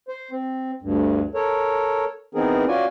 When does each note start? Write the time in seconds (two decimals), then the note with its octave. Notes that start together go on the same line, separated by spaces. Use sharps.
0.08 C5
0.31 C4
0.82 D2 G2
1.35 A4 A#4 C#5
2.35 E3 B3 C4 D#4 G#4 A#4
2.68 C#4 F4 F#4 D5 G#5